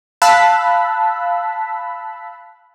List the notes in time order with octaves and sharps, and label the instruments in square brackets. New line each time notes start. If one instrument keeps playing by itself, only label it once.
[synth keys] F5 A5 B5 E6 F#6 B6